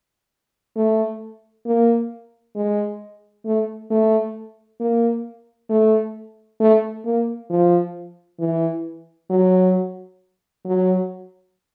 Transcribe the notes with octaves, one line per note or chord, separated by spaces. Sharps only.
A3
A#3
G#3
A3
A3
A#3
A3
A3
A#3
F3
E3
F#3
F#3